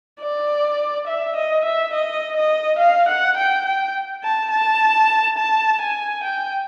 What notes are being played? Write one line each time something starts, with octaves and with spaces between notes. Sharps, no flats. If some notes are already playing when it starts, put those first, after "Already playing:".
D5
E5
D#5
E5
D#5
D#5
F5
F#5
G5
G5
A5
A5
A5
G#5
G5